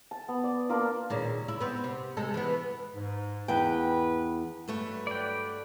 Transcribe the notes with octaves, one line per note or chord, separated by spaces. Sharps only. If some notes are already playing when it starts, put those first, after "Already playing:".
A5
B3
D5
A#3 D4 F4 A#4
D#2 A#2 C#3
E4
B3 C4
C3
C3 G#3 A4
E3 B3
G#2
E2 B4 G5
G2 D3 F#3 A3 B4 C#5
D5 G5